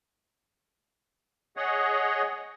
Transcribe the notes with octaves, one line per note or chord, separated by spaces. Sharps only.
G#4 C#5 D#5 F#5